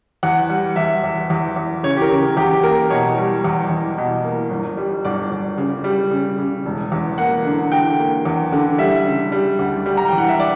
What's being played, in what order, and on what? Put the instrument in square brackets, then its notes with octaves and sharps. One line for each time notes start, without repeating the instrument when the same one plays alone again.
[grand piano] E2 F#5
G3
E2 E5
E2
E2
E2
C#3 C#5
G4
A#4
C#3
E2 G4
G4
A#3 A#4
B2 C#5
G3
E2
E2
B2
A#3
G1
G3
G1 D5
G1
C#3
G3
C#3
C#3
E1
E2
A#3 F#5
D3
D3 G5
A#3
E2
D3
G3 E5
C#3
G3
D2
G3
A#5
E3 G5
F#5
E5
D5